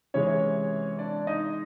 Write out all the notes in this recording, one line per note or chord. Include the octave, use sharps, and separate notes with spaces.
C3 E3 G#3 C#4 C#5
D4 D5
D#4 D#5